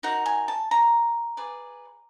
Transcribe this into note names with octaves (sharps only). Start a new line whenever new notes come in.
D#4 F#4 A#4 F#5
G#5
A5
A#5
G#4 B4 D5